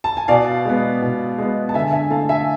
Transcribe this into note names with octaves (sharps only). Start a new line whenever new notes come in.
A5
G#5
B2 D5 F5
G#3 B3
B2
G#3 B3
A5
D3 E5 G#5
E5 G#5
A3 F5 A5
E5 G#5